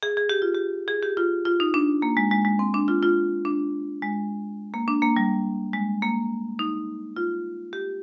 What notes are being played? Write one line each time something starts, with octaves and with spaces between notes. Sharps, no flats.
G#4
G#4
G4
F4
G4
G#4
G4
F4
F4
D#4
D4
A#3
G#3
G#3
G#3
C4
D4
F4
F4
D4
G#3
A#3
D4
A#3
G3
G#3
A#3
D#4
F4
G4